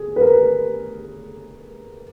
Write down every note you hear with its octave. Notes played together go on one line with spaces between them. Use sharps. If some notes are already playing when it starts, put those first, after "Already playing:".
Already playing: G#4
B4
A#4